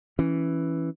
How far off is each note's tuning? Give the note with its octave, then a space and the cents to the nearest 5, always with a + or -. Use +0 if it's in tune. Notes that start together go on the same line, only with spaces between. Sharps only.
E3 +0 C#4 +0